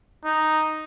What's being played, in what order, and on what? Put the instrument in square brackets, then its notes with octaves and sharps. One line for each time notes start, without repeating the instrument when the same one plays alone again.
[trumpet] D#4